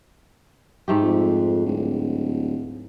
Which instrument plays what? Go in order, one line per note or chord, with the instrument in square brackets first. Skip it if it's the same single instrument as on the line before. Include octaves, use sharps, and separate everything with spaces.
[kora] G#2 A3 G4
[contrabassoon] F2
D1